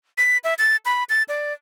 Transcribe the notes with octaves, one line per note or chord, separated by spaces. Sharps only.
B6
E5
A6
B5
A6
D5